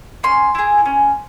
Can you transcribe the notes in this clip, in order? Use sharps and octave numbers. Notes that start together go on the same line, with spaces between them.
C#4 C6
E4 G#4
C#4